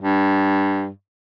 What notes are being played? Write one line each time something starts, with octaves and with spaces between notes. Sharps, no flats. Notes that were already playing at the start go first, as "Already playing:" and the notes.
G2